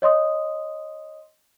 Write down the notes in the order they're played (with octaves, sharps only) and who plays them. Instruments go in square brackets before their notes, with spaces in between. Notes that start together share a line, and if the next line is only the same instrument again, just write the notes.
[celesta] C#5 D#5 C6 D#6